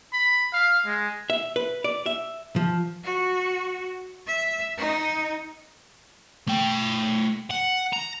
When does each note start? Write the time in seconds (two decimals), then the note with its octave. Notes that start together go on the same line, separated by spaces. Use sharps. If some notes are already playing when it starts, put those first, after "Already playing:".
0.13 B5
0.53 F5
0.85 G#3
1.30 E5
1.56 B4
1.84 D5
2.06 E5
2.56 F3
3.03 F#4
4.26 E5
4.77 D#4
6.48 A3 G5
7.50 F#5
7.93 A#5